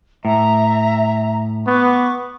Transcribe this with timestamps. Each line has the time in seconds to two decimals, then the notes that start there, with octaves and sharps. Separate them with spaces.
0.25 A2 E5 A#5
1.67 B3 C#6 D6